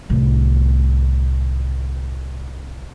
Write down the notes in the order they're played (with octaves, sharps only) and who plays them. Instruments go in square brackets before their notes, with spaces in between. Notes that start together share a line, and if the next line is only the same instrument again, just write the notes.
[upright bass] C2 A2